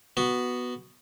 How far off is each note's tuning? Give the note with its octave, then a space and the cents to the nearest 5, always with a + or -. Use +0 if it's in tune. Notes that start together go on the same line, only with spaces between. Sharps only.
B3 +0 F#4 +0